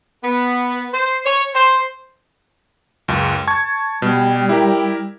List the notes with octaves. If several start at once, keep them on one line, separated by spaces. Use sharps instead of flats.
B3
C5
C#5
C5
C#2 F#2
A5 C#6 G#6
B2 G3
E4 G4 A#4